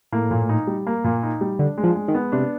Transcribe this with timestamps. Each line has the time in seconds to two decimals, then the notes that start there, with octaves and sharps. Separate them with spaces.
0.12 A2 A#3
0.31 A#2
0.49 D#4
0.67 G3
0.87 A#3
1.04 A#2
1.23 D#4
1.41 G3
1.59 D3 D4
1.77 G#3
1.83 F3
1.95 G#3
2.08 D#3
2.14 B3
2.32 C3 D4